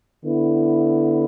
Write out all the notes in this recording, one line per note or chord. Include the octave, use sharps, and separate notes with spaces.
D3 B3 E4